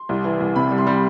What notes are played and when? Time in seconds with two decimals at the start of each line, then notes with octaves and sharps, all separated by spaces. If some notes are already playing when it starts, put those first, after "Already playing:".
Already playing: C6
0.09 C2
0.24 E3
0.40 C2
0.56 C3 B5
0.71 G3
0.78 C6
0.87 G3